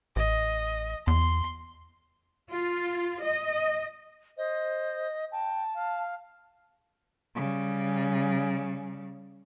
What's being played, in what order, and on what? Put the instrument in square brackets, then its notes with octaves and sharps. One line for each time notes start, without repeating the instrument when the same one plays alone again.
[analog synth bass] A1 [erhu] D#5
[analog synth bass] E2 [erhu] C6
[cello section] F4
D#5
[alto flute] C5 [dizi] D#5
[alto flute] G5 [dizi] A5
[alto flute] F5
[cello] C#3 G3